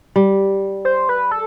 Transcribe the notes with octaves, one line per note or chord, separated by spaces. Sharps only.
G3
C5
B4
A4